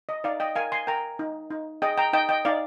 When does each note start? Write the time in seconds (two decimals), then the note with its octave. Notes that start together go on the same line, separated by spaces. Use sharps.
0.09 D#5
0.24 D#4 D5 F5
0.40 D#5 G5
0.55 A#4 F5 G#5
0.72 G#5 C6
0.87 A#4 G5 A#5
1.19 D#4
1.51 D#4
1.82 G#4 D#5 G5
1.97 G5 A#5
2.13 D#4 D#5 G5
2.29 D#5 G5
2.45 D#4 D5 F5